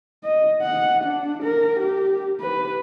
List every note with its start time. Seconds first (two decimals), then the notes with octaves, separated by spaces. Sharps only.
0.24 D#5
0.62 F#5
1.04 D4
1.43 A#4
1.80 G4
2.40 B4